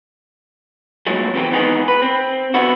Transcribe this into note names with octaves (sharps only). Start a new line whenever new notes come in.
G2 A#2 F#3 G#3 A3
E2 C3 E3 C4
D#3 E3 G#3 B3 D#4 G#4
B4
C4
D3 B3 E4 F#4